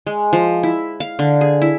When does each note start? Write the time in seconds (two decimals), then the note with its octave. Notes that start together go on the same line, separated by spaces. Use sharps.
0.07 G#3
0.33 F3
0.63 E4
1.00 F5
1.19 D3
1.41 G#4
1.62 E4